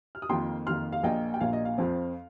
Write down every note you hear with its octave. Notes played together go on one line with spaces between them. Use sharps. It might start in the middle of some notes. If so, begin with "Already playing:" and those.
F6
D#6
F2 D#3 A#3 F4 G5 C6
F2 D#3 A#3 F4 C6 F6
F5
A#1 A#2 A#3 D#5 G5
G5
A#1 A#2 A#3 F5
D#5
F5
F2 F3 C4